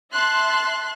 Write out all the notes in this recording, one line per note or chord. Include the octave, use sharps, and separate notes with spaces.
E5 A5 C6 F#6